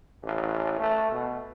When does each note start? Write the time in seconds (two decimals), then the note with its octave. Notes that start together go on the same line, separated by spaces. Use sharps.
0.23 A1
0.80 A3
1.12 B2